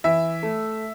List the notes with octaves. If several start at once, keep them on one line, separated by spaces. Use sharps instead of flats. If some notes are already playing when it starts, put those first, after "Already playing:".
E3 E5
A3